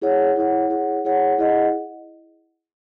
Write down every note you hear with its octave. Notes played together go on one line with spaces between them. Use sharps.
E4 G#4 C#5 F#5
E4 G#4 C#5 F#5
E4 G#4 C#5 F#5
E4 G#4 C#5 F#5
E4 G#4 D#5 F#5